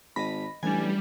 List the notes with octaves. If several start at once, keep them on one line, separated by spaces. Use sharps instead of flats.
G#1 D#5 B5 A#6
A1 E3 G3 D4 G#5